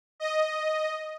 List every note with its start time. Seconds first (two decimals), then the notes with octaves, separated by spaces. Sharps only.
0.20 D#5